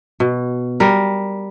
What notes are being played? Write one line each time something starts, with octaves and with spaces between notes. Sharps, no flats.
B2
G3 A#4